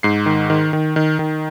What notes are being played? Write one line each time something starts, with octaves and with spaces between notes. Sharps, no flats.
G#2 C7
D#3
D#3
D#3
D#3
D#3